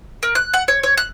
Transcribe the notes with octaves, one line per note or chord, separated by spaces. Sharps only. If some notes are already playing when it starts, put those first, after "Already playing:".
A#4
F#6
F#5
C#5
C#5
F#6